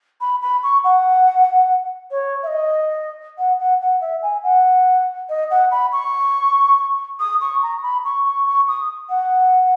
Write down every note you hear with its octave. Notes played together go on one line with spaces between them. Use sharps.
B5
B5
C#6
F#5
C#5
E5
D#5
F#5
F#5
F#5
E5
G#5
F#5
D#5
F#5
B5
C#6
D#6
C#6
A#5
B5
C#6
C#6
C#6
D#6
F#5